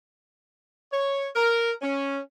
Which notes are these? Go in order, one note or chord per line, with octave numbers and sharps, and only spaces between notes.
C#5
A#4
C#4